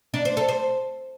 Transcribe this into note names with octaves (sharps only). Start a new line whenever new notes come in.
D4
C5
A4
C5